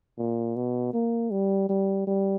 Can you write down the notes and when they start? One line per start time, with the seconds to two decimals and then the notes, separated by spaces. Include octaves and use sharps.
0.18 A#2
0.56 B2
0.94 A#3
1.31 G3
1.69 G3
2.07 G3